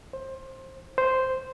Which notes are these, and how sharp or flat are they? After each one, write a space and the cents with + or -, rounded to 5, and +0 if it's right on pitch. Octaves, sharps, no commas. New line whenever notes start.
C5 +20
C5 -5